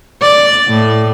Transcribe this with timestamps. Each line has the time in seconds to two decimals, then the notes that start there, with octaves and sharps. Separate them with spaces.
0.22 D5
0.68 A2